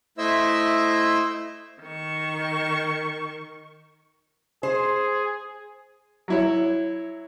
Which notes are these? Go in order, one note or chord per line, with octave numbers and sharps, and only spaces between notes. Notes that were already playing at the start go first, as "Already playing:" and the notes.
A3 E4 C5 D#5 E5 E6
D#3 C#6
G#4 C5
F#3 E4 C#5